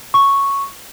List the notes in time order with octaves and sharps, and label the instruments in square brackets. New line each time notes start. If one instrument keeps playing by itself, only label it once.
[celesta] C#6